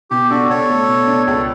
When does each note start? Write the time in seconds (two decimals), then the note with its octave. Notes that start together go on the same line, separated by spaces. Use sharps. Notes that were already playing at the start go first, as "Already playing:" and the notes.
0.11 B2 G4
0.30 D4 F#4 A4
0.49 B2 A4 C#5
0.69 A3
0.88 B2
1.07 D4
1.26 C#2 A4 C#5